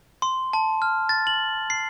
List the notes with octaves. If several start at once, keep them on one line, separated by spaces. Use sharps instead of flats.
C6
A5
F6
A6
F#7
C7